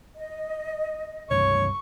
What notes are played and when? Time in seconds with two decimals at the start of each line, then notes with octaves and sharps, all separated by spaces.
0.15 D#5
1.31 C#2 G2 C3 C#5 C#6